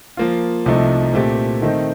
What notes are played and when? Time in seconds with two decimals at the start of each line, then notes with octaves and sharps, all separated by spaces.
0.17 F3 A#3 F4
0.66 C2 C3 F3 A3 D#4
1.14 A#2 A3 C4 G4
1.62 D#3 A3 C4 D#4